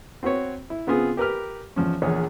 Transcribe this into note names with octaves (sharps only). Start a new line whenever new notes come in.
C4 F#4 B4 C#5
E4
C#3 B3 C4 F4 G#4
G4 A#4 B4 F6
E2 F3 C#4
A#1 E2 G#4 C#5